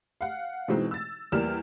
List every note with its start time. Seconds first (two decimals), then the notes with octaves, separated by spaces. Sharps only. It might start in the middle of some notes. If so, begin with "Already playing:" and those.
0.21 F5 F#5
0.68 B2 E3 G#3 C4 D#4
0.91 E6 A6
1.32 E2 G3 A#3 G4 F6 E7